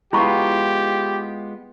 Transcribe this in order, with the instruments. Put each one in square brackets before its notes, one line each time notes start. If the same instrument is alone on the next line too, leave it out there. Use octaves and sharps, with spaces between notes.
[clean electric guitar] G#3 B3 F4 [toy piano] E4 B5 C#6 [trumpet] G4